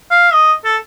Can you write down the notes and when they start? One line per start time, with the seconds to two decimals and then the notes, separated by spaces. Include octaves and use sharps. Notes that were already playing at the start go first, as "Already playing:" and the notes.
0.11 F5
0.32 D#5
0.64 A4